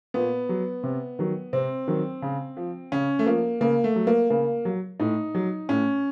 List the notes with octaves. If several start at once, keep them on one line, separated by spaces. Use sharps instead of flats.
A#2 B3
F#3
C3
D#3 F#3
C3 C4
D#3 F#3
C#3
F3
C#3 C#4
A3
F3 A#3
C#3 A#3
A3
F#3
A#3
C#3 A#3
F#3
A2 D#4
F#3
A2 C#4